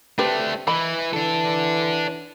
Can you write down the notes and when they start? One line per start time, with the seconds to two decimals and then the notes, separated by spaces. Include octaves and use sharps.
0.19 A3 C4 D4 G4 B4
0.67 E3 D#5 B5
1.13 E3 D4 A4